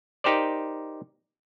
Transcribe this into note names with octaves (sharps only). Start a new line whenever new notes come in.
D#4 G4 A#4 C5 D5